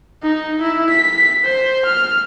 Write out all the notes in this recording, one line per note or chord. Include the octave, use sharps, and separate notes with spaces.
D#4
E4
B6
C5
F6